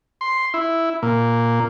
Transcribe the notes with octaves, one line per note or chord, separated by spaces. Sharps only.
C6
E4
A#2